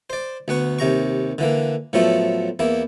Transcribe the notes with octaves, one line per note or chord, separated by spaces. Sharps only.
C5 D5
D2 B3 F#5 C#6
D#2 C3 A#5 C#6
D3 E3 A#3
A2 F3 F#3 A3 B3 E4
E2 A#3 E4